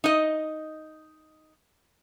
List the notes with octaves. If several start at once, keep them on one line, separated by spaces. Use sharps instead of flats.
D#4 D#5